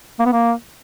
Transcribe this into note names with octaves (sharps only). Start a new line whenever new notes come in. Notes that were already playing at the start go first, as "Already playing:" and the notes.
A#3
B3
A#3